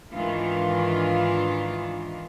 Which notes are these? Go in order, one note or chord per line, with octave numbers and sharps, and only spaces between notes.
G#2 D#3 E3 D4 F4